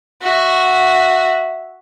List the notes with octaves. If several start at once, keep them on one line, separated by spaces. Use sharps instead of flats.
F#4 E5